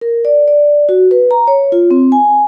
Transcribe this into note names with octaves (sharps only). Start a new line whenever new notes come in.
A#4
D5
D5
F#4
B4
A#5
C#5
F4
C4
G#5